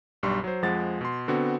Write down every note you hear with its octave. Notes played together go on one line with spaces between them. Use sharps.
B1 G2 G3 C6 C#6
F#3 C5
F2 F3 G#3 F#5 A6
B2 C6
D3 B3 C4 F#4